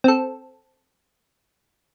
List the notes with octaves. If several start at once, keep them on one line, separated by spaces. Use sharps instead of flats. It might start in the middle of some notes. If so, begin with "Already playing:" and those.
C4 A4